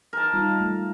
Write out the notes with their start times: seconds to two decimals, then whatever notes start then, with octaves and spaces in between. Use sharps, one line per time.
0.13 A#4 A5
0.33 G3 D#4 F4
0.61 A3